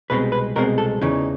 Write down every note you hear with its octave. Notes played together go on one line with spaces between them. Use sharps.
C2 B2 G#3 C4 B4
B4
C2 B2 G#3 C4 A#4
A4
E2 C#3 E3 D#4